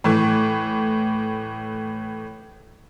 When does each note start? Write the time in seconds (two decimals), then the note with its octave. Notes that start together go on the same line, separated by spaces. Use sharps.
0.04 A2 E3